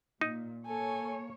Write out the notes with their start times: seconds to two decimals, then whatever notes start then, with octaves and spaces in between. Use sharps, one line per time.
0.21 A#2 D#4
0.66 A#3 A4 C#5 G#5